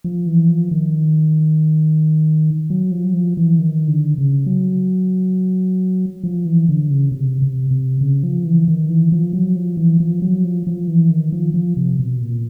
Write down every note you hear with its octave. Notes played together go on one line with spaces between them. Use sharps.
F3
E3
F3
D#3
F#3
F3
F#3
F3
E3
D#3
D3
C#3
F#3
F3
E3
D3
C#3
C3
C3
C3
C#3
F3
E3
D#3
E3
F3
F#3
F3
E3
F3
F#3
F3
F3
E3
D#3
F3
F3
C3
B2
A#2